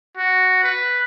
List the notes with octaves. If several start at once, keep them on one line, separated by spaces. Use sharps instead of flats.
F#4
B4